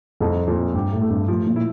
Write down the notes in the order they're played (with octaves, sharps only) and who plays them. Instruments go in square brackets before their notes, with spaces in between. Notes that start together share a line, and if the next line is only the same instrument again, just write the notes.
[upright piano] C2 [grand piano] F2
[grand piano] F2 [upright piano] A#2
[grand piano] G2 [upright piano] G4
[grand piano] A2
[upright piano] A3
[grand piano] G2
[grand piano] A2 [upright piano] F3
[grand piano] A#2
[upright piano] E4